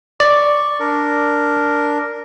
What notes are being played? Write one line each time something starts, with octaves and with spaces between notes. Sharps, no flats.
D5 C#6
D4 A#4